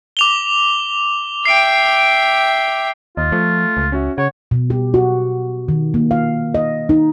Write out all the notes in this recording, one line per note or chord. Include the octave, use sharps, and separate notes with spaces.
D6 F7 G7
E5 G5 C7 D7
D#2 F4 D#5
F3 A3
C#2
C#4 F#4 E5
C#3 C#5 F#5
B2
G4
F#4
D#3
A#3
F5
D#5
D#4